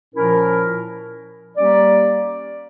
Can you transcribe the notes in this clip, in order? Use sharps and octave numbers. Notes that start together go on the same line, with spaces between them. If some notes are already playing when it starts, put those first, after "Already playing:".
A#2 F3 C#4 E4 A#4
G3 A#3 C#4 G4 D5